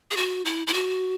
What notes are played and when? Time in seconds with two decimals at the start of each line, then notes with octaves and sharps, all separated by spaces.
0.11 G#4
0.17 F#4
0.45 E4
0.67 E4
0.74 F#4